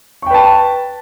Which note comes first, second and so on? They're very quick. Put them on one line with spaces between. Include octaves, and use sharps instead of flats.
C#6 G5 B4 A5